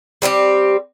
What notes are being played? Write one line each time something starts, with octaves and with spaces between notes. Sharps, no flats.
G3 C4 E4 G4